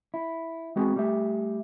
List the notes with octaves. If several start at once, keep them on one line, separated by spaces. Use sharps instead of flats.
E4
G#3 B3 C4 F#4 G#4
G3 A3 G4 E5